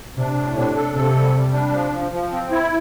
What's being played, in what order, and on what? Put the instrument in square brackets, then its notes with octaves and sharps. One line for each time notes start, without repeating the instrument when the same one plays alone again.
[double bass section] C3 [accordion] D4
[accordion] A2
[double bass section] C3 [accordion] D4
[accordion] A4
[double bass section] C3 [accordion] A4
[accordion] G3
G3
D4
F3
F3
F3
C4
E4